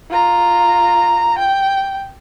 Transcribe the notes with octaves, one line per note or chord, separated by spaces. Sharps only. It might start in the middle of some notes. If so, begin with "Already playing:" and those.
F4 A#5
G5